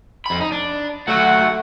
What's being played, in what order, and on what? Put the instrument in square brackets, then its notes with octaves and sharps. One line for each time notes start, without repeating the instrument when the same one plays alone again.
[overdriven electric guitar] F2 B5
D#4
D4
[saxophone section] F#3 F#5 [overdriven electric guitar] A3 F#4